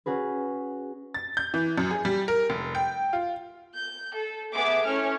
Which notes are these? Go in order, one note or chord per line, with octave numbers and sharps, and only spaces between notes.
C#4 F#4 G#4 B4
A6
G6
E3
F#2
G#4
G3
A#4
F1
G5
F4
G6
A4
A3 B3 G#4 E5 D6
A3 C#4 E4 C#5 F6